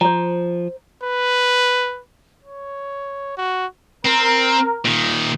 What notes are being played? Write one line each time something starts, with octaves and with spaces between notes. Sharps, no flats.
F3 C5 A#5
B4
C#5
F#4
C4 A#4
A#2 D#3